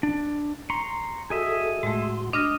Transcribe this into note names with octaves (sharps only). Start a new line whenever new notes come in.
D4
A#5 C6 C#6
F#4 G#4 A4 D#5 E5
A2 G#3 A3 F#4 C6
D4 D#5 F6 A#6